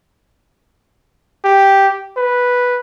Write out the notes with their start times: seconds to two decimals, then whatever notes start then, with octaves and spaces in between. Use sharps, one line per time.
1.44 G4
2.17 B4